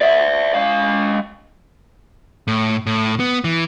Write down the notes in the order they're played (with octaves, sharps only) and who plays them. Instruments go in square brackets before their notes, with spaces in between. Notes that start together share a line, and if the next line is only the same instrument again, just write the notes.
[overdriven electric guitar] D5 E5
G#3 F5
[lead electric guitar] A2
A2
B3
E3